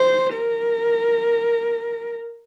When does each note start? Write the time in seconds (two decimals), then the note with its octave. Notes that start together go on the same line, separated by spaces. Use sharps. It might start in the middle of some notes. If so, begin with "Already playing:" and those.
Already playing: C5
0.33 A#4